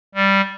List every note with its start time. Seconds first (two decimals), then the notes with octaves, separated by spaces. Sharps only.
0.15 G3